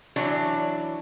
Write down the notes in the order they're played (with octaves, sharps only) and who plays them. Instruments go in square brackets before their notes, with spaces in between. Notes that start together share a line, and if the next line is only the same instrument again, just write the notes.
[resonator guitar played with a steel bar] E3 F#3 D4 C#5